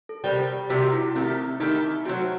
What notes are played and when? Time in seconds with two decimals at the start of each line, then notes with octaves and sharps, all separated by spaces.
0.09 A4
0.24 C3 D#3 G3 G4
0.70 C3 D#3 G3 F#4
0.92 E4
1.15 D#3 A3 C4 E4 G4
1.60 D#3 A3 D#4 E4 G4
2.05 F#3 A3 C4 F#4